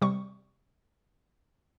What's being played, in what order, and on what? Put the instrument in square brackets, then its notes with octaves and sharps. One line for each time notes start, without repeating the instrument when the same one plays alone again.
[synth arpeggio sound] C3 G3 C#6